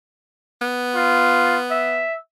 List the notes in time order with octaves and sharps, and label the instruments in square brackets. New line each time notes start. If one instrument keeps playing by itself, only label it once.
[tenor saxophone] B3
[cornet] F4
E5